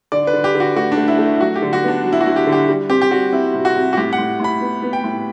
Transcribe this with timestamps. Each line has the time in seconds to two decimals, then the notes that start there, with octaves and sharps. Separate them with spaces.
0.12 D3 D5
0.27 B4
0.33 D3
0.44 G4
0.54 D3
0.60 F#4
0.76 A3 F#4
0.92 D4
0.97 A3
1.08 E4
1.18 A3
1.36 E4
1.40 F#3 F#4
1.56 G4
1.62 D3
1.73 F#4
1.83 B3 D4
2.04 F#3
2.13 E4
2.21 F#4
2.26 D2
2.36 G4
2.47 D3
2.52 G4
2.69 G3
2.90 C4 G4
3.02 G4
3.11 G3 F#4
3.33 C4 E4
3.54 C3
3.65 F#4
3.76 C3
3.93 F#4
3.97 A2 G4
4.13 F#5
4.18 A2
4.40 A2 B5
4.61 B3
4.82 B3
4.93 G5
5.04 A2